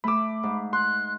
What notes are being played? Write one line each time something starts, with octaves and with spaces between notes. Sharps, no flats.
A3 B5 D6 E6
G#2
C6 F#6